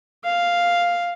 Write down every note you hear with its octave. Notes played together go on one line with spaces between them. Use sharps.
F5